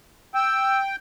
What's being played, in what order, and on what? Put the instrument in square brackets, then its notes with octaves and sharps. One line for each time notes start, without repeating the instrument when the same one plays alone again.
[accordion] G5 [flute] E6